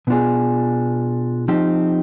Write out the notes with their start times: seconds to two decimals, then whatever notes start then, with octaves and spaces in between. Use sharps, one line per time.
0.07 B2 B3 D4 F4 G#4
1.48 F3 C4 D#4 G4